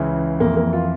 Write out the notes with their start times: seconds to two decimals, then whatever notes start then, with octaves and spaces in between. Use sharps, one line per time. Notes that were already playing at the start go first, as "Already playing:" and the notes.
Already playing: C#2 C#3 E3
0.40 F2 E3 A#3
0.57 A#3
0.73 F4